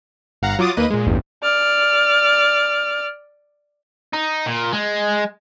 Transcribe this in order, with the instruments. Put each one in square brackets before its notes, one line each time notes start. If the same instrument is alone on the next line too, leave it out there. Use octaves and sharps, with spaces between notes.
[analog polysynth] G1 F5 F#5 A#5
F#3 F4 D6 D#6 A6
D#2 A#3 B4 D#5 D#7
A#2 G#3
A1 E2 G2
[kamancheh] D5 F6
[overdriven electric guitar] D#4
A#2
G#3